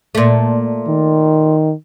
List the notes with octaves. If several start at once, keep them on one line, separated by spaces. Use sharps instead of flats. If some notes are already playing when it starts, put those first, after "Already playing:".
A#2 A3
D#3